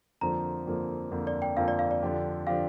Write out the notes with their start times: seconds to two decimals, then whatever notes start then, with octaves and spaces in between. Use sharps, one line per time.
0.21 F2 D3 F3 A#3 A#5
0.67 F2 D3 F3 A#3
1.12 F2 D3 F3 A#3
1.27 D5
1.42 G5
1.56 F2 D3 F3 A#3 F5
1.68 D5
1.79 F5
1.91 D5
2.03 F2 D3 F3 D4 G4
2.47 D3 F3 D4 G4 F5